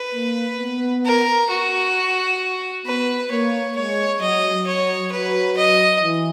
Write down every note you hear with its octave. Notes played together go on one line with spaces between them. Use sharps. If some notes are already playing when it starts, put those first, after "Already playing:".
Already playing: B4
A#3
B3
A#4
F#4
B3 B4
A#3 C#5
G#3 C#5
F#3 D#5
F#3 C#5
F#3 B4
D#5
E3